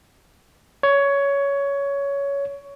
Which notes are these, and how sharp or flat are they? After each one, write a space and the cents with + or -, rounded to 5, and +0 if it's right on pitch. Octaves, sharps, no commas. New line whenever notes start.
C#5 +15